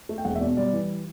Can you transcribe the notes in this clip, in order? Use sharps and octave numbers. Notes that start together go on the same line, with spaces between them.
A3
G5
E1 F#5
E5
B2 D5
G3 D5
E3